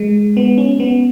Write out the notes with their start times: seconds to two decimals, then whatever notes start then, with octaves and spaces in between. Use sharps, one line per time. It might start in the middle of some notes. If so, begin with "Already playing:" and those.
Already playing: G#3
0.37 B3
0.58 C#4
0.80 B3